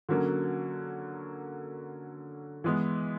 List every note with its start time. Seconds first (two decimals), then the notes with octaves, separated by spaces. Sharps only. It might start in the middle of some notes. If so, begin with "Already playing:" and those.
0.09 D3 F#3 A#3 C#4
2.64 E3 G#3 B3